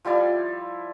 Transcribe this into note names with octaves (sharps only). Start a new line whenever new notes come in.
F3 G3 E4 D5